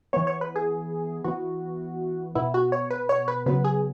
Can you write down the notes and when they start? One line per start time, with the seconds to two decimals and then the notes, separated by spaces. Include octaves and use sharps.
0.13 E3 B3 C#5
0.27 C#5
0.41 B4
0.56 G#4
1.24 E3 B3 F#4
2.35 B2 B3 E4
2.54 F#4
2.72 C#5
2.91 B4
3.09 C#5
3.28 B4
3.46 C#3 F#3 B3 B4
3.64 G#4